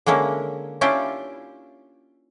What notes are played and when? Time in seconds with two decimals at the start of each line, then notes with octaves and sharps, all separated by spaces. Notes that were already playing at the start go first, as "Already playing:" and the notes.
0.06 D3 G#3 A#3 C#4 E4
0.81 C#4 D4 E4 F4 G4